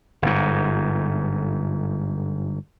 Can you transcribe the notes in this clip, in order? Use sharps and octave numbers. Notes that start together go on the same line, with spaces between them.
G1 G#2